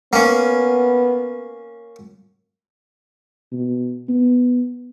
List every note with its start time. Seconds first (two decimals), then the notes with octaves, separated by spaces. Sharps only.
0.13 A#3 B3 C#4
3.52 B2
4.09 B3